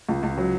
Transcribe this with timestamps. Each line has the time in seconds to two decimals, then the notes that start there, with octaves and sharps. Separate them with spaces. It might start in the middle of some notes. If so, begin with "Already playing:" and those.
0.09 C#2
0.23 C#2
0.38 F#3